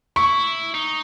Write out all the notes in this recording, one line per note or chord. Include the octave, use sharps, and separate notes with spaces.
E4 C#6
D#4